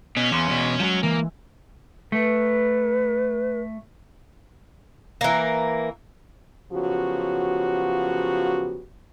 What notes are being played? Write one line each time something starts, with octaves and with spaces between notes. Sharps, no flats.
B2 C#4
E2 F5 C6 D6
E2 B2
F3 F#3 G#3
E3 A#3
A3 B4
E3 A#3
C#3 F3 F#3 B3 F#4 G4